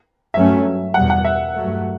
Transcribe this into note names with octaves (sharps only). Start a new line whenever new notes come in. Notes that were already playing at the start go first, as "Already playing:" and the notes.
G2 F#3 A3 C#4 E5
E2 B2 G3 F#5
F#5
E5
G2 F#3 A3